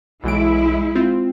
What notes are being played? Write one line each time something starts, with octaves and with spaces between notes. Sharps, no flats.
B1 E3 G#3 E4 D7
C4 F4